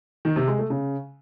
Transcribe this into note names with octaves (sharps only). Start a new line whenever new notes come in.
D#3
C3
G#3
A3
C#3